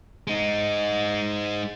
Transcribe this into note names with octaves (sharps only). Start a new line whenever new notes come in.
G#3 D#4